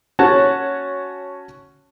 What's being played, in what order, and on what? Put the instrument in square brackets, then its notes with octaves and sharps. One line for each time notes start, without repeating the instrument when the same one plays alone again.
[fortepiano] C#4 F#4 C#5 A5